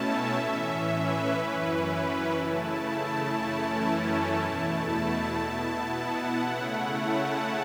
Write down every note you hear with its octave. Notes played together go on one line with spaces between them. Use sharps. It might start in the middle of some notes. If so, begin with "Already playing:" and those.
Already playing: B2 A3 C#4 E4 E5 A5
A2 E3 C#4
B4
F#2 E3 C#4 E4
C#3 A3 E4 A5
F#2 E3 A3 C#4 E4 A5
A5
E2 B2 A3 E4
A5
B2 B3 E4
F#5
C#3 A3 C#4 E4
A5